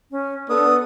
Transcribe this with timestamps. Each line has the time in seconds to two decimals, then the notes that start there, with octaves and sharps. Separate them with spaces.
0.11 C#4
0.49 B3 D4 A4 D#6